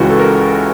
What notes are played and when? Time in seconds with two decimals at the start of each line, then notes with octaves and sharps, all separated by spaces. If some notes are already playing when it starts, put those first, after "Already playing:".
Already playing: C#2 C#3 E3 F#4
0.10 A4
0.20 A#4